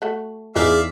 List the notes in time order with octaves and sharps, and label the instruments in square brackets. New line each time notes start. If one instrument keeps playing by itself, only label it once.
[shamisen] A3 F#4
[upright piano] E2 [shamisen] C#4 D#4 B4 [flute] G#4 [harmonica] D5 E5 F5